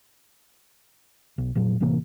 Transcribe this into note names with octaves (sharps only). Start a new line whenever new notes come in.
B1
F1 A#2 F#3
A2 C3 E3 A#3